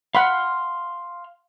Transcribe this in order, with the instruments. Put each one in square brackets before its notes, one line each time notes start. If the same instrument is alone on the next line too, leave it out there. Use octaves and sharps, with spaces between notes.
[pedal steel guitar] F5 C6 F6 [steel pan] F#5 B5